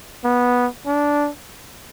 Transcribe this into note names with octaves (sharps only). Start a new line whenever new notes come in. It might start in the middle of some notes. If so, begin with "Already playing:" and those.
B3
D4